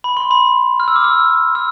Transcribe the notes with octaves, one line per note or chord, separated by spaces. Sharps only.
B5
C6
B5
F6
E6
D6
E6
E6